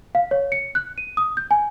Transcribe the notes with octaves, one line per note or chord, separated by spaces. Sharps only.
F5
C#5
C#7
F#6
D#7
D#6
G6
G#5